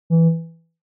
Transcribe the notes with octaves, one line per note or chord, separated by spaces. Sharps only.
E3